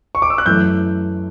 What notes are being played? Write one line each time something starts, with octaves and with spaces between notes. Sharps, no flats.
C#6
D6
E6
F#6
F#2 E3 A3 G6